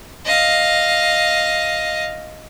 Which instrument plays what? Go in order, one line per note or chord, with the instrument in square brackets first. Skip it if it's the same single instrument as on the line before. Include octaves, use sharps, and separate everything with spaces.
[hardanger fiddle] D#5 F5